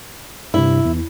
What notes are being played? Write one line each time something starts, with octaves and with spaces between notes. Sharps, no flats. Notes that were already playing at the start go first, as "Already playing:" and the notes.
G2 C3 E4
E2